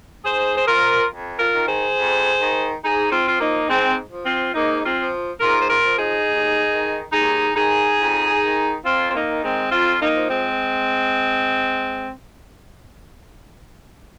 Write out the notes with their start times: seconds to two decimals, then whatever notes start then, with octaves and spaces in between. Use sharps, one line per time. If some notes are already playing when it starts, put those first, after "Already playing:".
0.24 G#2 G#4 C5
0.57 C5
0.66 F3 F4 A#4
1.10 F2
1.39 F4 A#4
1.53 D#3
1.67 G#4 C5
1.97 F2
2.39 D#3
2.82 G#2 D#4 G#4
3.10 C4 F4
3.25 F3 F4
3.39 A#3 D#4
3.68 G#2 G#3 C4
4.11 F3
4.25 C4 F4
4.54 G#2 A#3 D#4
4.84 C4 F4
4.98 F3
5.40 G#2 F4 A#4
5.60 C5
5.69 F4 A#4
5.84 F3
5.97 D#4 G#4
6.27 D#2
6.70 D#3
7.13 D#2 D#4 G#4
7.56 D#3 D#4 G#4
7.99 F2
8.42 D#3
8.84 F2 C4 F4
9.10 C4
9.14 A#3 D#4
9.28 D#3
9.43 G#3 C4
9.70 F2 C4 F4
10.00 A#3 D#4
10.14 F3
10.28 G#3 C4